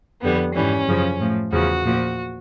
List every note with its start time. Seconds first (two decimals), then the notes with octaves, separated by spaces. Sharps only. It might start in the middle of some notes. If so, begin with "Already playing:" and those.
0.22 F2 D3 G3 B3
0.55 G#2 E3 G3 C#4
0.87 F#2 C#3 F3
1.19 A2 F3
1.52 E2 C#3 F3 F#4
1.84 A#2 F3